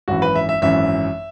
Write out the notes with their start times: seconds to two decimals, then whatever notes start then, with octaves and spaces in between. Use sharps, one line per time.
0.08 G#1 F#2 E3 F#4
0.22 B4
0.35 E5
0.49 E5
0.62 G#1 F#2 E3 E5